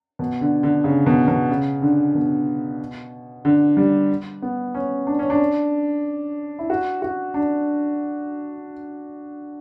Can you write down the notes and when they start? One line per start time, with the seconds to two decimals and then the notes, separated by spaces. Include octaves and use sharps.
0.19 B2
0.41 D3
0.63 D3
0.84 C#3
1.06 B2
1.28 B2
1.50 C#3
1.82 D3
2.15 B2
3.45 D3
3.77 G3
4.42 B3
4.75 C#4
5.07 D4
5.19 C#4
5.30 D4
6.59 E4
6.70 F#4
7.02 F#4
7.34 D4